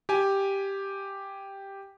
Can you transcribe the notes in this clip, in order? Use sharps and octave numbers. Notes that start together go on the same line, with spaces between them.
G4 G#5